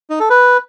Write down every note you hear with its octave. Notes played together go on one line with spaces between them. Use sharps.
D#4
A4
B4